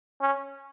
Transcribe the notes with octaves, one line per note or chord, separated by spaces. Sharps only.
C#4